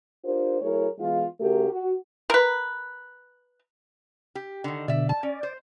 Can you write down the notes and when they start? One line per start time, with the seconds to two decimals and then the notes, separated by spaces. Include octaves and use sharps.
0.25 D4 F4 G4 A#4 C5
0.61 F#3 A3 E4 G#4 A#4 C#5
0.99 E3 G#3 B3 F4
1.40 C#3 A3 F#4 G4 A#4
1.71 F#4
2.30 A#4 B4
4.35 G4
4.64 D3 D#3
4.88 B2 D3 D5 E5
5.09 A5
5.23 C#4 D5
5.43 C5